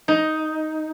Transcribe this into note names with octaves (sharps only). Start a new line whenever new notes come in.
D#4